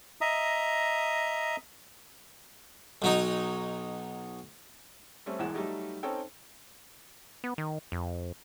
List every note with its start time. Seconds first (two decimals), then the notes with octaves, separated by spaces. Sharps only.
0.21 D#5 E5 A#5 D#6
3.02 B1 F#3 D#4
5.26 G3 A3 C4 C#4
5.39 E1 E2 E3 G#3 F#5 E7
5.55 F#3 G3 A3 D#4 G4
6.03 C4 C#4 D#4 A4 G5
7.44 B3
7.58 D#3
7.92 F2